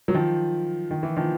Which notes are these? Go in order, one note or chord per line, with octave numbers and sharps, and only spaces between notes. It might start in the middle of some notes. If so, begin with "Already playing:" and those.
F#3
D#3 F3
D#3
E3
D#3 F3